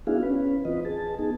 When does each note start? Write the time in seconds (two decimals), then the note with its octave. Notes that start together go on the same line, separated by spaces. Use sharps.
0.07 B3 D4 E4 F#4 G#4 F5
0.23 C#4 B4
0.65 E3 C4 F4 B4 D#5
0.85 G#4 A5
1.19 B3 D#4 G#4